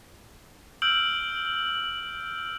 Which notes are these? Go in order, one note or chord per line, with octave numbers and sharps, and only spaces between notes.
E6 F6 G6 D7 F#7